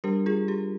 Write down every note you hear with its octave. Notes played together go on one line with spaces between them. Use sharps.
G3 D4 G4 A#4
F4 G#4
G4